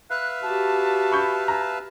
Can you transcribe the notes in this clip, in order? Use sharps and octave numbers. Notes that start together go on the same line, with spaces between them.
B4 E5 F5 F#6
F#4 G4 A5
B5 C#6 G6
A5 A#5